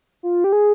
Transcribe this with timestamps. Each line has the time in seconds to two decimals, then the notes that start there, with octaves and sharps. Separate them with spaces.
0.23 F4
0.44 G4
0.53 G#4